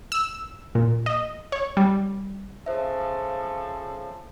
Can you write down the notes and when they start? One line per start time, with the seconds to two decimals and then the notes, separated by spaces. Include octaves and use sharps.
0.12 E6
0.75 A#2
1.06 D#5
1.52 C#5
1.77 G3
2.66 C#3 F3 A4 C5 E5